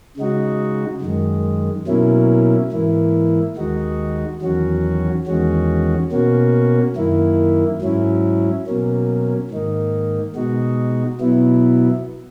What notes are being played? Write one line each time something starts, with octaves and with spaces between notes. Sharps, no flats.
C#3 G#3 D#4 F#4
F#2 D#3 G#3
B2 F#3 A#3 C#4 E4
G#2 E3 A#3 E4
D#2 D#3 G#3 D#4 F#4
E2 D#3 F#3 C#4 F#4
E2 D#3 G#3 C#4 F#4
B2 A#3 C#4 F#4
F#2 D#3 A#3 E4
G#2 F#3 C#4 E4
B2 F#3 A#3 C#4
G#2 D#3 A#3 D#4
B2 G#3 D#4 F#4
B2 F#3 B3 E4